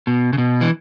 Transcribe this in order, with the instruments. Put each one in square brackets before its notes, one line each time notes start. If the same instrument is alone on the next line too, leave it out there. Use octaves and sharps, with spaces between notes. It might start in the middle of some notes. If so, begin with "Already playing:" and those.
[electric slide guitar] B2
C#3
B2
E3